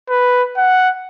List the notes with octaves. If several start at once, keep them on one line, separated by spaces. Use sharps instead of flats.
B4
F#5